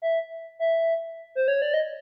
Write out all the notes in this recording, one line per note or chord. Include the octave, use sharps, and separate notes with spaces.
E5
E5
C5
C#5
D5
D#5